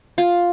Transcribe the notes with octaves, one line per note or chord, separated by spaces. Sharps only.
F4